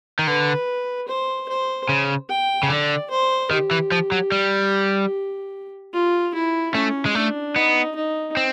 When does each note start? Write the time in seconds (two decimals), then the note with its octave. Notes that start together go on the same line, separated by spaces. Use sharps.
0.19 D#3
0.27 D3 B4
1.08 C5
1.48 C5
1.89 C#3
2.29 G5
2.63 C#3
2.70 D3 D5
3.11 C5
3.51 D#3 G4
3.71 E3
3.92 F3
4.12 F#3
4.32 G3
5.93 F4
6.34 E4
6.75 A3 C#4
7.06 G#3
7.15 A3 D4
7.55 B3 D#4
7.95 D#4
8.37 C4